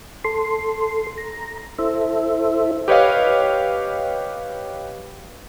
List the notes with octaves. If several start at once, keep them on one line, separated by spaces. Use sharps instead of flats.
A4 C6
A#5
E4 A4 C5 E5
G4 B4 C#5 D#5 F5